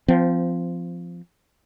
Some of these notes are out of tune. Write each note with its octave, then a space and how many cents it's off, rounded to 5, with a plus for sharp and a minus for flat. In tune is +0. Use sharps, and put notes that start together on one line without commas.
F3 -10 C4 -25